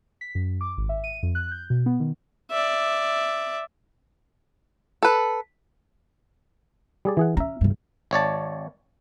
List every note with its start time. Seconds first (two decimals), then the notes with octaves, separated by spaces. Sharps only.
0.21 B6
0.35 F#2
0.61 D6
0.78 G#1
0.89 E5
1.04 D#7
1.23 F2
1.35 F#6
1.52 G6
1.70 B2
1.86 B3
2.00 D#3
2.51 D5 E5
5.03 A4 B4
7.05 G3 G#4 D5
7.17 E3 G#4 F#5
7.37 C#4 E5 A#5
7.61 G2 C#3
8.11 G#1 C#5 D5 A5